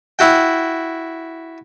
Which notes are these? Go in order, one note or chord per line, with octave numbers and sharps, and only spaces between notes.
E4 F#4 G5